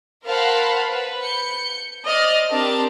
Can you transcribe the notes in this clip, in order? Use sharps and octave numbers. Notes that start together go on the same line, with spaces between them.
A#4 C5 F5 F#5 A5 B5
B4
G6 C#7
C5 D5 D#5 F6
C4 D4 G4 A#4 D5 A5